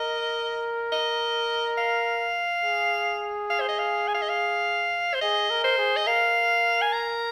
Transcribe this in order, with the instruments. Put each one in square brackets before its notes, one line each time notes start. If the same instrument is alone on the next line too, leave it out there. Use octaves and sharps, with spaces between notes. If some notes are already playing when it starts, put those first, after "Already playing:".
Already playing: [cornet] A#4 [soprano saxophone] D#5
[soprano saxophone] D#5
F5
[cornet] G#4
[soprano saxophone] F5
C5
D#5
F5
G#5
F5
D#5
F5
C5
[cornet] G#4 [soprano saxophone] D#5
[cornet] A#4
[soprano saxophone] C5
[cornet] G#4
[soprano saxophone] D#5
[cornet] A#4 [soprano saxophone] F5
[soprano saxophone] G#5
A#5